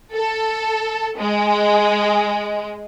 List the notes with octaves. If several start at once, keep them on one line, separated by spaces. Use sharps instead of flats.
A4
G#3